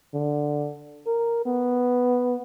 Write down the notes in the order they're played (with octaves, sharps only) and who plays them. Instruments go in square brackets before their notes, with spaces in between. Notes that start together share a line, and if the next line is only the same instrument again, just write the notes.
[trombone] D3
A#4
B3